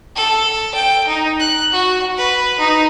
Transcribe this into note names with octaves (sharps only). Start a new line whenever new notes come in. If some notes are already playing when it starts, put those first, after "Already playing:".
A4
G5
D#4
F#6
F#4
B4
D#4